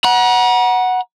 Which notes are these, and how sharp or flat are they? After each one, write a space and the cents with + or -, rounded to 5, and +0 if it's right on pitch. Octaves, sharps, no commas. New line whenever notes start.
F#5 +0 A#5 +45